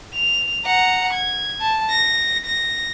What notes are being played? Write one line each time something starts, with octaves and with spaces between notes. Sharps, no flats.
F7
F#5 A#5
G#6
A5
A#6
A#6